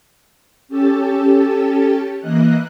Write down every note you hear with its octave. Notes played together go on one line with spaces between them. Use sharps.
C#4 G4 A4 A5
E3 A#3 D#5 F#6